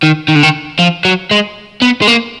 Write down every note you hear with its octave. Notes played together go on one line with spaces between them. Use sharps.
D#3
D#3
D3
D#3
F3
F#3
G#3
B3
G#3
A#3